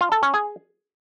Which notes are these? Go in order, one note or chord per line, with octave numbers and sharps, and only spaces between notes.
F4
A4
C#4
G#4